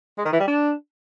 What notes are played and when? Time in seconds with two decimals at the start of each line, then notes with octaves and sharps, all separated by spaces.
0.18 G#3
0.25 D#3
0.33 E3
0.40 G3
0.47 D4